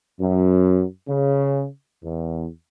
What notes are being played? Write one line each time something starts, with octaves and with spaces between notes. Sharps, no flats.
F#2
C#3
E2